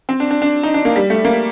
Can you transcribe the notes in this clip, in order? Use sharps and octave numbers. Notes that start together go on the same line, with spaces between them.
C4
D4
D4
D4
D#4
D4
A#3
G3
A3
A#3